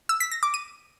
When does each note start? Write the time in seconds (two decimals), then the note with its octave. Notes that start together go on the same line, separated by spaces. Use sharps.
0.09 E6
0.20 B6
0.32 A#6
0.43 D6
0.54 D#7